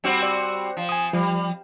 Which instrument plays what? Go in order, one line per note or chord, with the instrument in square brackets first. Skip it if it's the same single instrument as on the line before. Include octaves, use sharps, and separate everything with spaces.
[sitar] G3 C4 F#4
[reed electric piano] D5
[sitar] F3
[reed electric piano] G#5 D#6
[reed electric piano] F3 [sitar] G3